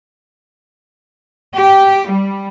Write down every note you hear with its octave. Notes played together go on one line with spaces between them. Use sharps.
G4
G3